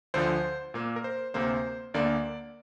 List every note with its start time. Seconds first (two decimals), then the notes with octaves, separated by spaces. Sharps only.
0.14 D2 D3 F3 C5
0.74 A#2 A#3
0.96 A#4
1.04 C5
1.34 D2 C3 A#3 C5
1.94 D2 D3 A#3 D5